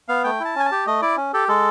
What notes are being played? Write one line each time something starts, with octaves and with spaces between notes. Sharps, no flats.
B3 F5
A3 G5
E4 A5
C#4 G#5
A5
G4
A3 D#5
E4 D5
C#4
G4 A4
G#3 A4